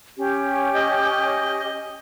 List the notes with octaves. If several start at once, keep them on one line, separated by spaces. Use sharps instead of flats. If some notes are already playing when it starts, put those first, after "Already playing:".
C#4 G4
D#5